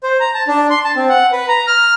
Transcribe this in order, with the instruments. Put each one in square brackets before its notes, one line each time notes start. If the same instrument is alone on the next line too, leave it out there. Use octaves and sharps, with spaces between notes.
[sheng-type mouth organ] C5
A#5
A5
D4
C6
A5
C4
F#5
B4
A#5
F6